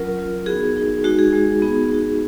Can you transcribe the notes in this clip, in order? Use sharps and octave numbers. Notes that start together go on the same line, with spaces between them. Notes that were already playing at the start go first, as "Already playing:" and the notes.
Already playing: F#3 C#4 F4 A#4
F#3 C#4 F4
B3 D#4 F#4 G#4
B3 D#4 F#4
G#3 D#4 F#4
G#4
G#3 D#4 F#4
B3 D#4 F#4 G#4
B3 D#4 F#4